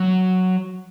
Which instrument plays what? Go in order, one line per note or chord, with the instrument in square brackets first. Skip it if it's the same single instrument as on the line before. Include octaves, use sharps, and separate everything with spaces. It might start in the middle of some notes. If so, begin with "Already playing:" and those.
Already playing: [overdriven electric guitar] F#3